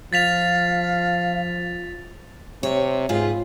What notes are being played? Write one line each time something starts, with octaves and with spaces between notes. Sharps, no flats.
F3 F5 A6 B6 F7
C3 C#5
G#2 F4 G#4 B4